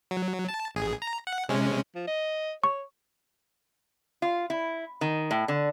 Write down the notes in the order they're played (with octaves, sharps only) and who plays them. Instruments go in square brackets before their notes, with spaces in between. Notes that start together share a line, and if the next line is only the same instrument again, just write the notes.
[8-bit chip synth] F#3
A5
A1 G#4
A#5
F#5
C3 G#3 C#4
[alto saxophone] F3
D#5
[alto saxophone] C#5 [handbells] C#6
[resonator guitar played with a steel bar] F4
E4
D#3
A2
D3